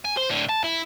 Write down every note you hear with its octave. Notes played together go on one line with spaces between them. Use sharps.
G#5
C5
A2 D3
A5
E4